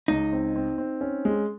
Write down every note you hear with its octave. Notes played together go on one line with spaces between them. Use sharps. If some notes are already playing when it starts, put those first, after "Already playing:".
C#2 D#4
C4
C4
C4
C#4
G#3